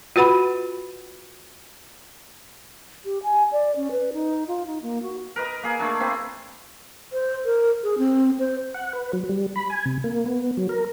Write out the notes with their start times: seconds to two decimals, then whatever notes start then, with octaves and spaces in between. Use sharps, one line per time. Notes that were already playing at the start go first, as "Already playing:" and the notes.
0.16 F4 F#4 B4 F#5 B5
3.05 G4
3.23 G#5
3.52 D5
3.76 C#4
3.91 B4
4.13 D#4
4.48 F4
4.67 D#4
4.82 A#3
5.03 F#4
5.36 A#4 B4 D#5
5.63 A#3 G#4
5.79 A3 D4 G#4
6.00 A#3 C4 E4 C5
7.13 C5
7.45 A#4
7.84 G#4
7.98 C4
8.39 C5
8.74 F#5
8.93 B4
9.13 F#3
9.29 G3
9.56 B5
9.70 G#5
9.86 C3
10.04 A#3
10.26 B3
10.57 F#3
10.69 A#4